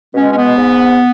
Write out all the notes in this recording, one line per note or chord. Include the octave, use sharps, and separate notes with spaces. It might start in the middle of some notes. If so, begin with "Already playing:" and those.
B2 G#3 C#4
C#4
B3
G#2